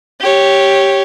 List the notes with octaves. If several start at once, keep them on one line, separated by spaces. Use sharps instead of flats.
G4 C#5